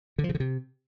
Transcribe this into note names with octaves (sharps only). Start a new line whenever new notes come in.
D3
F3
C#3
D3
C3